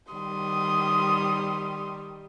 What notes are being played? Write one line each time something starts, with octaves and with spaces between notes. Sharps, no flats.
D#3 G3 C6 D#6